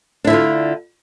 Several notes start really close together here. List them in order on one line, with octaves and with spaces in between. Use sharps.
D4 E4 D3 F4